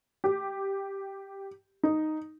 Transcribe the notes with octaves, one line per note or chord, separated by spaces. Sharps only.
G4
D#4